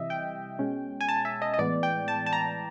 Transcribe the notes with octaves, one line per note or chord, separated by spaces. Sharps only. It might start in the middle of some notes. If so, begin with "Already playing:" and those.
Already playing: C3 E3 G3 D#5 E5
G5
B2 G#3 C#4
G#5
A5
E5
D#5
D#5
A2 E3 G#3 B3 D5
G5
A5
A5
A#5